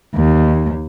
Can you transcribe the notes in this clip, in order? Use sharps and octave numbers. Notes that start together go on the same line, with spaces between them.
D#2